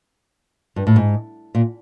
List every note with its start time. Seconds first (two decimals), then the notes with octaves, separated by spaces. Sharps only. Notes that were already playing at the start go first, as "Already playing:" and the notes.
0.76 G2
0.87 A2
0.96 G#2
1.55 A#2